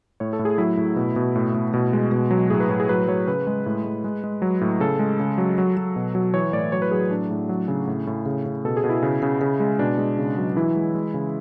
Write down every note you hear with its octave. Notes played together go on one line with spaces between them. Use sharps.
A2 C#5
A4
A2
G#4
F#3 E4
A2
B2
B2
A2
A2
B2
G#3
B2
F#3
A2 G#4
B4
A2
G#4
F#3 B4
F#3 C#5
C#3 B4
G#3
A2
G#3
G#3
G#3
F#3
A2
C#3 A4
G#3
C#3
F#3
F#3
F#3
B2
F#3
E3 C#5
A2 D5
F#3 C#5
B4
F#3 G#4
A2 D4
A2
F#3
C#3
A2
A2
C#3
C#3
B2 A4
G#4
B2
E4
C#3
C#3
C#3
G#3
B2 D4
G#3
C#3
F#3
E3 E4
G#3
G#3
C#3